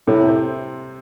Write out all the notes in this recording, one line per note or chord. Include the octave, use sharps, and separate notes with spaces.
A2 C3
C4